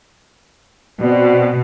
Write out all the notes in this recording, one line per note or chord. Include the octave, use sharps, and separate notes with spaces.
B2 C4 F#4 D5